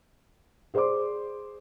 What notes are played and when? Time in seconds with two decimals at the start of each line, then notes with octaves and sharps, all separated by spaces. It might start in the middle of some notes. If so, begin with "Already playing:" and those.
0.74 G#4 C5 D5 C6 D6